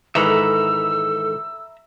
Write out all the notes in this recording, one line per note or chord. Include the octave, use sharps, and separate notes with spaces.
G#2 D#3 E3 A4 E5 A#5 B5 E6